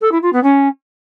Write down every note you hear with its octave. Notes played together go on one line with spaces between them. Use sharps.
A4
E4
F4
B3
C#4